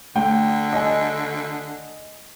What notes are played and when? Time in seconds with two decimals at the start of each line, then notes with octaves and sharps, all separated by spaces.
0.16 D3 A3 G5
0.73 D#5 G#5